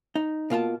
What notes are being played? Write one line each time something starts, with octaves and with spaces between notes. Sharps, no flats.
D#4
B2 A#3 F4 A5